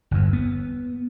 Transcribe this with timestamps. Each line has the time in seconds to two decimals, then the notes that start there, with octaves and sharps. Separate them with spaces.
0.11 G1 E2
0.33 B3